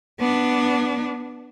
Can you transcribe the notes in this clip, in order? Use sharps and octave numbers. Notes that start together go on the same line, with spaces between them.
B3 D4